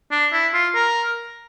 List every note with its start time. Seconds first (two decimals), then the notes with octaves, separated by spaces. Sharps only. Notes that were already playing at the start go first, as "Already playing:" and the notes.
0.12 D4
0.33 E4
0.54 F4
0.75 A#4